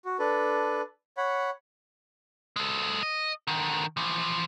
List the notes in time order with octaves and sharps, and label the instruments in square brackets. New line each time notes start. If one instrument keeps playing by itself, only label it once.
[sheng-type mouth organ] F#4
D4 A4 B4
C#5 F#5 B5
[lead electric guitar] G#3 A4
D#5
D3 D#3
E3 F3